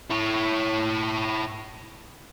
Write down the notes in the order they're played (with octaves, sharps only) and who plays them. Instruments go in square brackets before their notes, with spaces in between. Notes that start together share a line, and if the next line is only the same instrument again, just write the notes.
[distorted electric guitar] E4 C#5